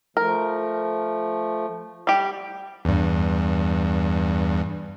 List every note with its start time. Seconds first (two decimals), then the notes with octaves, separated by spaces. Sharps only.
0.17 F3 A3 A#4
2.07 G3 G4
2.85 E2 G2